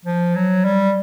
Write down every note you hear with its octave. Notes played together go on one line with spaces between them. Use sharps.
F3
F#3
G3